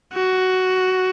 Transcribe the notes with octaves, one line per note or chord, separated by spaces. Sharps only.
F#4